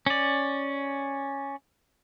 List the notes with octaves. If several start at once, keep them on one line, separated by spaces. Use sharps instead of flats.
C#4 D5